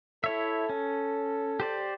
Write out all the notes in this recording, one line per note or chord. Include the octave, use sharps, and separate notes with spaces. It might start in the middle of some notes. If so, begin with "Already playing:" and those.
E4 A4 C#5 E5
C#4
G4 C5 D5